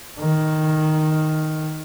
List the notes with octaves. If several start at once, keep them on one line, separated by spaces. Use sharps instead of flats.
D#3